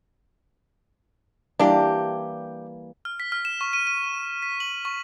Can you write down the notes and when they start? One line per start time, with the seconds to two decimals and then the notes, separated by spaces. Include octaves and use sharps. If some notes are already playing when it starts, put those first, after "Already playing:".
1.59 E3 G3 A#3 D4 G4
3.05 F6
3.20 B6
3.32 F6
3.45 E7
3.61 C#6
3.73 D#7
3.87 D#7
4.42 B6
4.60 F#7
4.85 C#6